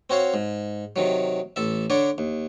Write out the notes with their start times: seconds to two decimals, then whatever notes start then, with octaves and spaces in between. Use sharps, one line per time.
0.10 C4 F#4 C#5 F5
0.34 G#2
0.96 C3 D#3 F#3
1.56 A1 A4 E5
1.90 D3 D4 C#5 D5
2.18 D#2